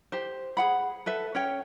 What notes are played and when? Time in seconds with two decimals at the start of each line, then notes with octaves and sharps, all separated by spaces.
0.12 G4 C5
0.57 G#4 F#5 B5
1.06 A4 B4 E5
1.35 C#4 C#5 G5